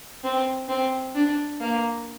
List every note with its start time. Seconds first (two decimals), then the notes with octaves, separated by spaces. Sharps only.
0.24 C4
0.69 C4
1.15 D4
1.61 A#3